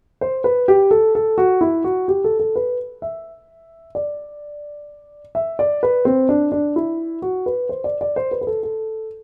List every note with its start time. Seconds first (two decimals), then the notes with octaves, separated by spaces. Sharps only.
0.21 C5
0.44 B4
0.68 G4
0.91 A4
1.15 A4
1.38 F#4
1.61 E4
1.84 F#4
2.08 G4
2.24 A4
2.39 A4
2.56 B4
3.02 E5
3.95 D5
5.35 E5
5.59 D5
5.83 B4
6.05 C4
6.29 D4
6.52 D4
6.76 E4
7.22 F#4
7.46 B4
7.69 C5
7.84 D5
8.01 D5
8.16 C5
8.31 B4
8.41 B4
8.47 A4
8.63 A4